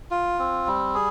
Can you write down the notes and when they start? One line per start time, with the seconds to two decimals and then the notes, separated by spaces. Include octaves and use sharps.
0.11 F4
0.39 C4
0.67 G3
0.94 G#4